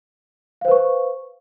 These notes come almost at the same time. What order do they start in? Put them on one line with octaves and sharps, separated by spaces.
F5 C5 B4 C#6